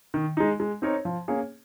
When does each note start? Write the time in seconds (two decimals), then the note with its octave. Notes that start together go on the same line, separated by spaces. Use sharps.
0.14 D#3
0.37 G#3 D#4
0.60 G#3
0.82 C4 D#4 A#4 C#5
1.05 F3
1.28 A#3 C#4 G#4 C#5